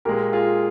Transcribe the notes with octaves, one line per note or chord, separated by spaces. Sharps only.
A#2 G#3 G4 A#4
F4 G#4